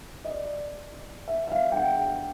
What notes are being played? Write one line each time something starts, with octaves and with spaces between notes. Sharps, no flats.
D#5
D5
E5
E5
F5
G5
F#5